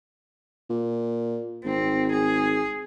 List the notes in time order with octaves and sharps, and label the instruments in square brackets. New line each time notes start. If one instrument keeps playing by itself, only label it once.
[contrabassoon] A#2
[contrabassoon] G#1 [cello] C4
[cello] G#4